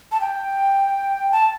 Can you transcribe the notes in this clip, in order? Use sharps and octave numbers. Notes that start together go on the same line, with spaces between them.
A5
G5
A5